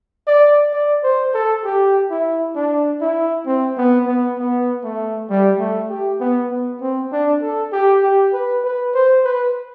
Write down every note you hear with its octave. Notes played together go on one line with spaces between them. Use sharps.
D5
D5
C5
A4
G4
E4
D4
E4
C4
B3
B3
B3
A3
G3
A3
G4
B3
B3
C4
D4
A4
G4
G4
B4
B4
C5
B4